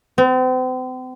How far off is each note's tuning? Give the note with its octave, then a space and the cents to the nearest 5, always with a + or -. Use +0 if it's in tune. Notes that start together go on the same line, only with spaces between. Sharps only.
C4 -40